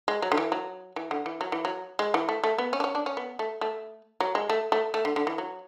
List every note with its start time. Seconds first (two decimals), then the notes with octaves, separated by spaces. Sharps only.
0.08 G#3
0.22 F#3
0.32 D3
0.37 E3
0.52 F#3
0.96 E3
1.11 D3
1.26 E3
1.41 F#3
1.52 E3
1.65 F#3
1.99 G#3
2.14 E3
2.29 A3
2.44 A3
2.58 B3
2.73 C#4
2.80 D4
2.84 C#4
2.95 D4
3.06 C#4
3.17 B3
3.39 A3
3.61 A3
4.20 F#3
4.35 G#3
4.49 A3
4.72 A3
4.94 A3
5.05 D3
5.16 D3
5.27 E3
5.38 F#3